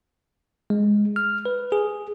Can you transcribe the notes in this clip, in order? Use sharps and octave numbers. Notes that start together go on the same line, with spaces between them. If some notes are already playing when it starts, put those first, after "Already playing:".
G#3
F6
B4
G#4